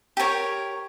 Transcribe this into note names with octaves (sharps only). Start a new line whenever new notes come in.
G4 A#4 C#5